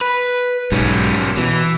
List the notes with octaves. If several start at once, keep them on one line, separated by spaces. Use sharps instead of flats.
B4
B1 G#2 B2 G3 C#4
B2 E3